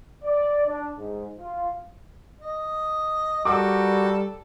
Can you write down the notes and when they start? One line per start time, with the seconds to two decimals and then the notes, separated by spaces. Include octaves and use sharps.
0.24 D5
0.67 D4
0.98 G#2
1.39 F4
2.41 D#5
3.45 G3 F#4 G4 A4 A#4 D6